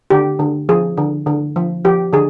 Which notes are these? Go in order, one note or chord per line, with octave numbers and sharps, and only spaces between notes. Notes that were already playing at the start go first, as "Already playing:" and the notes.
D3 G4
D3
F3 G#4
D3
D3
F3
F3 G4
D3 G#4